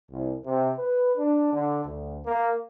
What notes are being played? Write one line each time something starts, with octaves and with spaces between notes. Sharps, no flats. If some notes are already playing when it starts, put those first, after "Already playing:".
C2
C3
B4
D4
D3
D2
A#3